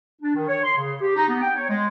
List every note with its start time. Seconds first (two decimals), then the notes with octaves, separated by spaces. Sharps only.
0.21 D4
0.35 D#3
0.49 C#5
0.64 C6
0.76 C#3
1.01 G4
1.16 D#4
1.29 B3
1.41 G5
1.55 C#5
1.69 G#3